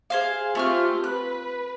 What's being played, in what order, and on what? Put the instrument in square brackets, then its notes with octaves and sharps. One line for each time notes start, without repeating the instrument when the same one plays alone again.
[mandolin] G#4 C5 F5
[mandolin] A3 C#6 F6 [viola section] C4 F4 G4
[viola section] B4 [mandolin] F#6